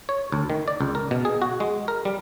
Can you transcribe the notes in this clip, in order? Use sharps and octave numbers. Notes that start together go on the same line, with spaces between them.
C#5
D2
D#3
D5
C#2
A#4
B2
G#4
F#4
G#3
A#4
G3